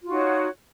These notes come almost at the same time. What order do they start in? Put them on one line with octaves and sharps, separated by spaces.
F4 F#4 D#4 C#5